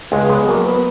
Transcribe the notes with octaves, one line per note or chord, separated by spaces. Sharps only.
C#2 G#3 G#4
G#3 B3 G#4
F#3 A#3 A#4
B3 B4